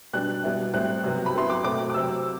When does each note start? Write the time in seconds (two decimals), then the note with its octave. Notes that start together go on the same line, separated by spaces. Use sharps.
0.13 B2 G3 D4 F#6
0.43 B2 G3 B3 E4
0.74 A2 G3 C4 E4 F#6
1.04 C3 F#3 B3
1.26 B5
1.34 F#3 B3 E4 C6
1.50 D6
1.64 B2 A3 C4 D6
1.90 D6
1.94 C3 F#3 C4 E6